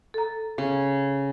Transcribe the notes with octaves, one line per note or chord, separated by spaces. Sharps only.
A4 A#5
C#3